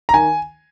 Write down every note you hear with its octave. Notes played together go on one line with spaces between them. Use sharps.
A#5
D#3 G#5